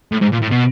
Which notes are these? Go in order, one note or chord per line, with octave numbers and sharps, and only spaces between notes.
A2
G#2
A#2
A2
B2